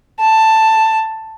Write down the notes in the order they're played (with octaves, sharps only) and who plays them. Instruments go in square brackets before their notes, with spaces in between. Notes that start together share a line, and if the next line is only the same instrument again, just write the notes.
[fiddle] A5